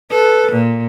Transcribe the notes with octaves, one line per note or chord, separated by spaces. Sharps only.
A4 B4
A#2